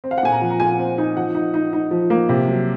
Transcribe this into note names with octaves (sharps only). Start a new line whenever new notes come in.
C4
F5
F#5
A#2 G#5
A#5
F3
A#5
A#2 G#5
C4
D#4
F3 F#5
D#4
D#4
D#4
F3
A#3
C3
F#3